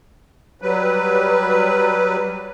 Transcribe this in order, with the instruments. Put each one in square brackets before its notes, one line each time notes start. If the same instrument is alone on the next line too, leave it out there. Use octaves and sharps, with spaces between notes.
[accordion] F#3 G3 B4